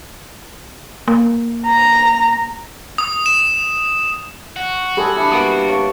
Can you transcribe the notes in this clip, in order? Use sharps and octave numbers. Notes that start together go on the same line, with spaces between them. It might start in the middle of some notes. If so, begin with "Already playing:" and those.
A#3
A#5
D#6
E7
F#4
G3 G#4 A4 C6
D4 E4
G3 A#3 B3 D#6
C#5 F5 F#5